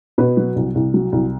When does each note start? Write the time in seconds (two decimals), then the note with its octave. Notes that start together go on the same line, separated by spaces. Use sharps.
0.18 B2 B4
0.37 F#3
0.56 C2
0.75 C2
0.94 F#3
1.12 C2